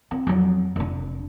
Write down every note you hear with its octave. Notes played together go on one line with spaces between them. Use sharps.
C4
F2 F#3
F1 D4